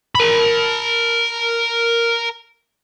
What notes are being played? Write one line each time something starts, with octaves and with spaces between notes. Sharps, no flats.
A#4 B5